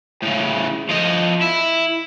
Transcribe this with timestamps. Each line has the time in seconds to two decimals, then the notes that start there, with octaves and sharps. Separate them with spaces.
0.22 A2 C#3
0.89 F3 D#5
1.41 E4